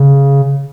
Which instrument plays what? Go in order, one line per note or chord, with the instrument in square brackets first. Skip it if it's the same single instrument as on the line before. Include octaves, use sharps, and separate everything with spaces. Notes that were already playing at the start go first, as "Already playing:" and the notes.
Already playing: [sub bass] C#3